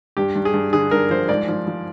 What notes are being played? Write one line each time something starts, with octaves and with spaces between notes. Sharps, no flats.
G2 G4
G2
G#4
G2
D3 G#4
G2 A#4
F3 C5
G#2 D5
F3
F3